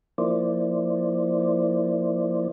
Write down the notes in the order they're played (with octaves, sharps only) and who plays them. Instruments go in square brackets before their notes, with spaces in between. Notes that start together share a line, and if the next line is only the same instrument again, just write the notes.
[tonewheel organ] F3 A#3 E4 C5 D5